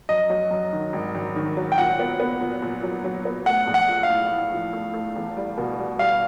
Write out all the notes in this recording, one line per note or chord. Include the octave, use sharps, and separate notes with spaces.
F#2 D#5
F#3
F#2
D#3
G#1
G#1
D#3
F#3
G5
A#2 F#5
B3
B3
A#2
A#2
F#3
F#3
B3
A3 F#5
A#1
F#5
F3
F5
A2
A2
F3
A3
A3
E2
G3
B2
G3
G3 F5